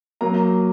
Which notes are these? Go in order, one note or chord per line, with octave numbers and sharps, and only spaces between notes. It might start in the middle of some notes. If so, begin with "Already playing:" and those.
F#3 A#3 A#5